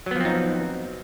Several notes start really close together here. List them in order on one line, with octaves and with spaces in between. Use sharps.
F#3 B3 F3 C4 D#4